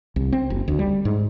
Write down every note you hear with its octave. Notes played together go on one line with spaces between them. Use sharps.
C2
C4
F#1
D2
G3
G#2